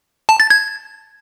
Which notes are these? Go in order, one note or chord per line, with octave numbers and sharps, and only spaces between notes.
A5
A6
G#6